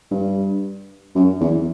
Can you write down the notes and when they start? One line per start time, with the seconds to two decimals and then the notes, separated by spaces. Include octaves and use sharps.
0.11 G2
1.15 F#2
1.41 E2